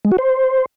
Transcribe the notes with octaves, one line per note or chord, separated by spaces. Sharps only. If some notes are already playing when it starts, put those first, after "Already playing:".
G#3
F#4
C5